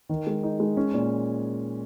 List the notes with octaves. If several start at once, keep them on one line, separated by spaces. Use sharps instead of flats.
D#3
G#3
D#4
G#3
C#4
A#2